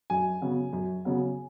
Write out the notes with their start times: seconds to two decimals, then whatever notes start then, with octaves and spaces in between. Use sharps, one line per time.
0.10 F#2 G#5
0.42 C#3 F#3 B3
0.73 F#2
1.05 C#3 F#3 B3